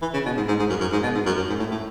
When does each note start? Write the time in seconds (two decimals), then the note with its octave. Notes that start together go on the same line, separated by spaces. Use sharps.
0.02 E3
0.14 C#3
0.26 B2
0.37 G#2
0.48 G#2
0.59 G#2
0.69 F#2
0.81 F#2
0.92 G#2
1.03 B2
1.15 G#2
1.26 F#2
1.37 F#2
1.49 G#2
1.59 A2
1.71 A2